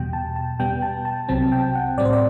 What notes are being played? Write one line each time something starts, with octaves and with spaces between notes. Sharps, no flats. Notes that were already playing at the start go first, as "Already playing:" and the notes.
Already playing: E2 B2 G3 G5
A5
A5
B2 G3 B3 G5
A5
A5
C2 C3 F#3 C4 A5
G5
F#5
A2 G3 C4 D5
C5
D5